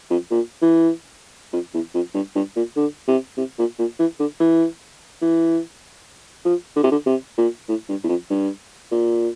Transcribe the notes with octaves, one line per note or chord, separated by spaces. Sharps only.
F2
A#2
E3
F2
E2
F2
G2
G2
A#2
D3
C3
C3
A#2
A#2
E3
D3
E3
E3
F3
D3
C3
D3
C3
A#2
A2
G2
E2
F2
G2
A#2